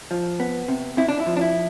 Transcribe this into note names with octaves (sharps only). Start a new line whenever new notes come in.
F3
B3
C3
C3 E4
D4
E4
F3
D4
E4